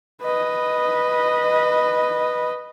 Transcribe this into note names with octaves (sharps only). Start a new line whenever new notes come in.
B4 D#5